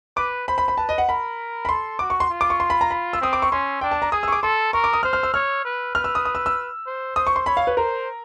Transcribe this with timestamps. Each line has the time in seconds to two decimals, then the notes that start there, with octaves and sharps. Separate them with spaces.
0.17 B4 D6
0.48 C5 B5
0.58 B5
0.68 B5
0.78 B4 A5
0.89 D#5
0.98 F#5
1.08 A#4 B5
1.65 B5
1.69 A4 C6
1.99 F#4 D6
2.10 C#6
2.20 C6
2.30 F4
2.41 D6
2.50 C#6
2.60 C6
2.70 B5
2.81 A#5
2.91 B5
3.13 E6
3.21 C4 D#6
3.33 D6
3.42 C#6
3.52 C#4 C6
3.81 D4 G5
3.91 A5
4.02 A#5
4.12 G#4 D#6
4.23 E6
4.28 C#6
4.32 D6
4.43 A4 C6
4.73 A#4 C#6
4.84 D6
4.93 D#6
5.03 C5 F6
5.13 F6
5.23 E6
5.34 C#5 F6
5.65 B4
5.95 B4 F6
6.04 E6
6.15 D#6
6.25 D#6
6.35 E6
6.46 E6
6.86 C5
7.16 C5 D#6
7.27 C#6
7.36 C6
7.46 C#5 B5
7.57 F5
7.67 B4
7.77 A#4 C5